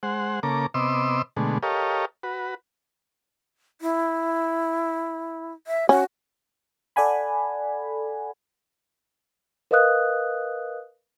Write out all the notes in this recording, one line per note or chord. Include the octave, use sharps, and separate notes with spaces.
G#3 C5 F#5
C#3 A#3 A4 A#5 D6
C3 B3 D#5 C6 D6 E6
B2 D3 G#3 A3
G4 A4 A#4 C#5 D#5 F5
F#4 B4
E4
E5
C#4 F#4
A4 D5 F#5 G#5 B5
A#4 B4 D#5 F5 D#6 F#6